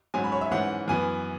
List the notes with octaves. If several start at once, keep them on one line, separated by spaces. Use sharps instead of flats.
G#2 F#3 C#4 G#5
B5
C#5
E5
G#2 E3 C#4 F#5
F#2 E3 B3 G#5